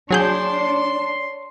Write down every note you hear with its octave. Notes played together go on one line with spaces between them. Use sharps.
F#3 D4 G#4 C#5 A5 C6 G6